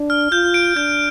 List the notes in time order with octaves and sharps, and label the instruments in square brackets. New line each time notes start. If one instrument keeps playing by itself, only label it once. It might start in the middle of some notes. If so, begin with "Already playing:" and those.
Already playing: [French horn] D4
[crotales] F6
[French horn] F4 [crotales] G6
[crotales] D7
[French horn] D4 [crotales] G6